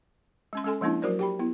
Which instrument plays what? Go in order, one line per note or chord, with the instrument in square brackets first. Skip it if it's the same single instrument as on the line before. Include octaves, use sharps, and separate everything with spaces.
[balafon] G#3 C#4 C6
G#3 C#4 A4 G#5 C6
F3 G#3 A#3 C#4 D4 E4
F#3 F#4 A#4 C5 D5
G4 G5 B5
B3 E4